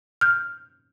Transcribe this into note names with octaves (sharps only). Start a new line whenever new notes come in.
F6 G6